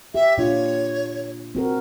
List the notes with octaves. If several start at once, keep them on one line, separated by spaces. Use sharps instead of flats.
G4 E5
A#2 D4 F4 C#5
C4 F#4 A#4